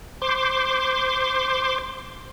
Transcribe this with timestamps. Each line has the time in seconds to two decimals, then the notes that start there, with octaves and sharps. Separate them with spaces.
0.22 C5 C6 D6